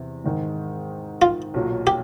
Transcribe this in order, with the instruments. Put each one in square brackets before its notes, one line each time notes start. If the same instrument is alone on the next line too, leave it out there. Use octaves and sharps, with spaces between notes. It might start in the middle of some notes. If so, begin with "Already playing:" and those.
Already playing: [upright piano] E2 C3
G#2 D#3 G#3
[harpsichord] F4
[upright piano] B1 A#2 F#3
[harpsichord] G4